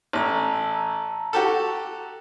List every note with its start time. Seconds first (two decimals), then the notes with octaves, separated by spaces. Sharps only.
0.13 A1 A5 A#5 E6
1.33 F#4 G4 A4